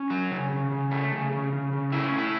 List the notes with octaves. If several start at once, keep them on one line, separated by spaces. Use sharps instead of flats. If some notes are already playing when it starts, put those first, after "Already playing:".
Already playing: C#4
F#3
C#3
C#3
C#3
A3
C#3
C#3
C#3
C#3
A2 E4
C#4
A2
E4